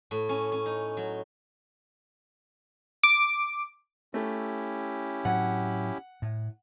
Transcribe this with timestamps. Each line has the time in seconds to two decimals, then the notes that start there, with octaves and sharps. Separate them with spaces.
0.11 A2
0.29 C#4
0.52 C#4
0.66 D#4
0.97 F#3
3.03 D6
4.14 A3 C#4 E4 G4
5.25 A2 F#3 F#5
6.22 A2